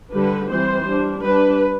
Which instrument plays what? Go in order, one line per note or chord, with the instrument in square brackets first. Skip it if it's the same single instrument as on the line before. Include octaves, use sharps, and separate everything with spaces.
[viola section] D3 G3 D4 B4
E3 G3 C4 C5
G3 D4
G3 D4 B4